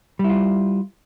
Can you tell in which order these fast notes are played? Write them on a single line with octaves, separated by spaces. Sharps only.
G3 E4 F4